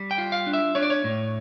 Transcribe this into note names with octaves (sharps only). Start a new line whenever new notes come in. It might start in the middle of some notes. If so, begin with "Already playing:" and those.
Already playing: G3
G5
F4
F5
D4
E5
D4 C#5
D5
C#5
A2